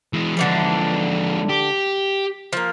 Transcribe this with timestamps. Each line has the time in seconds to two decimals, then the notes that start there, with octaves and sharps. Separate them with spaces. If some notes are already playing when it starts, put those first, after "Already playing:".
0.13 E3 G#3
0.37 D3 E3 F3 G3 G#3
1.49 G4
2.53 F3 A#3